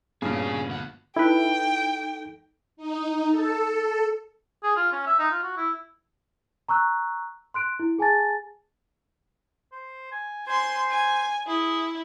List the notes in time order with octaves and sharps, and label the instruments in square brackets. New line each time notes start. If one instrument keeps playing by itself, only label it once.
[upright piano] A#1 G2 B2 [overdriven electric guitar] C#4 G#4
[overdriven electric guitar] D2 F#5
[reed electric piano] D#4 A4 [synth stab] E4 B4 [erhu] G5
[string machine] D#4
A4
[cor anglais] G#4
F4
C#4
E5
D#4
F4
F#4
E4
[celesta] A#5 C#6 E6 F#6
C6 F#6 D7
E4
G#4 G#5 A5 A6
[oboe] C5
G#5
[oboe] C5 [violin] G#5 C6
[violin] G#5
[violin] E4 [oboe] G#4